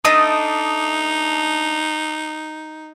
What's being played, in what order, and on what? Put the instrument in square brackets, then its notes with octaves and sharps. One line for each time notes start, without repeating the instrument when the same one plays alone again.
[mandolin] A3 D4 D#5 [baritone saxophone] D#4 [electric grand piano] D#6